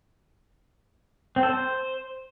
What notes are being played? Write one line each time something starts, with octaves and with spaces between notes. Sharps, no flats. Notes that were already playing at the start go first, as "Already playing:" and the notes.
C4
A4
C5